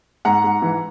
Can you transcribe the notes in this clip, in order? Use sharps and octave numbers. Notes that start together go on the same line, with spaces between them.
G#2 F#5 A#5
G#2
E3